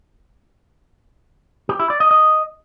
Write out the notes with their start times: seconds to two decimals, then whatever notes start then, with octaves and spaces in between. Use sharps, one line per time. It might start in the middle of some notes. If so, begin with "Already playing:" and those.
1.69 G4
1.79 E4
1.90 D5
2.00 D#5
2.11 D#5